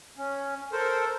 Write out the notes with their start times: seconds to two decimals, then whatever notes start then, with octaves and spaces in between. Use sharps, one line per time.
0.18 C#4
0.72 A4 A#4 C5